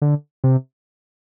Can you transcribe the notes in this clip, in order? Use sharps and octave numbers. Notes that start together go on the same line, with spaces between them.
D3
C3